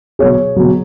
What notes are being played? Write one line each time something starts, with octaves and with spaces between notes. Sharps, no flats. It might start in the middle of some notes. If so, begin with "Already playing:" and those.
B2 F#3 G#4 C#5
B2 F#3